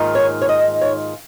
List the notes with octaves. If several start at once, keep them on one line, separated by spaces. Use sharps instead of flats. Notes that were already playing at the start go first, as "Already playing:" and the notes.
Already playing: G#2 D#3 A#3 F4
C#5
C#5
D#5
C#5